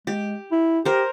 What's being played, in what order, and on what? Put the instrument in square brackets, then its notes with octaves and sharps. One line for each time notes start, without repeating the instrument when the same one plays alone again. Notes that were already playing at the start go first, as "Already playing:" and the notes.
[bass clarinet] G#3 [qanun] G4
[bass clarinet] E4
[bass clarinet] G4 [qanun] A#4 C5